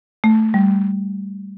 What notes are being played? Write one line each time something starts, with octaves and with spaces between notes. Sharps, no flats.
A3
G3